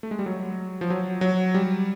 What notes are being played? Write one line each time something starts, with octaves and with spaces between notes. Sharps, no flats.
A3
G#3
G3
F#3
F3
F#3
F#3
G3